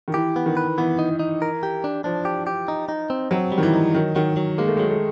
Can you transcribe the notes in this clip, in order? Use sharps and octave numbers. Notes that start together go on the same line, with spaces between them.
D#3
E3 G4
B3
D#3
B4
E3 B3
D#4
D#4
A#4
G4
D4
F3 D4
G4
G4
D#4
D#4
C4
F#3 C4
G3
D#3
E3
D#4
D#3 F#3
D#3 F#3
F#3
G#3 A#3
A3
F#3 G#3
A3